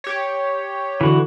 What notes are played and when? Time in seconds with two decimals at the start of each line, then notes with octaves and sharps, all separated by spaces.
0.04 G4 C#5
1.01 D3 E3 F#4